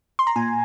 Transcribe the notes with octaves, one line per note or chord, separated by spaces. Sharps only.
C6
A#5
A#2 G#5